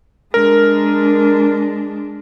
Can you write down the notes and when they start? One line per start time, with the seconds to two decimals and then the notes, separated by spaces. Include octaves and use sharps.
0.34 G#3 D4 A#4